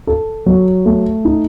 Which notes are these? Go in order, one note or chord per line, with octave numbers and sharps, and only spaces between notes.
A4
F#3
A3
D#4